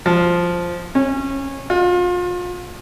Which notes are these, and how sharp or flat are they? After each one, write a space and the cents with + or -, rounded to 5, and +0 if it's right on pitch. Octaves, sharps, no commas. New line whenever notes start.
F3 +0
C#4 -20
F4 +35